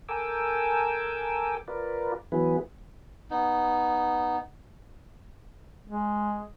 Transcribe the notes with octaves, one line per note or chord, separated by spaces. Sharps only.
A4 A#4 G5 G#5 D6 E6
F4 A#4 B4 D5
E3 F#3 B3 E4 G#4 B4
B3 D#4
G#3